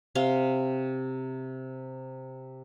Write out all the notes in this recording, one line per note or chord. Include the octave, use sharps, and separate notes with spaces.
C3 F5 C6